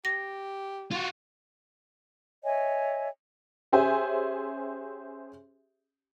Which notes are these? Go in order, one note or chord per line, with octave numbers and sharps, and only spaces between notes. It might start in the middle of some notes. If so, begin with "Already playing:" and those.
G4 A#6
F4 F#4
C#5 D#5 E5 G#5
C#4 G4 G#4 C5 E5 G#5